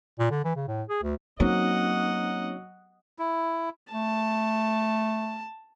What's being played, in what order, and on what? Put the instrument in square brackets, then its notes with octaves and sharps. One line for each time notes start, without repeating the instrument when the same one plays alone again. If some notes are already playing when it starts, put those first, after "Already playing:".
[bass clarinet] A#2
D3
E3
C#3
A2
G#4
D2
[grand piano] F#3 [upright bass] A#3 [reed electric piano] C4 C#4 D#4 [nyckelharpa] D#5 F#5
[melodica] E4
[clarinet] A3 [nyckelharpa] A5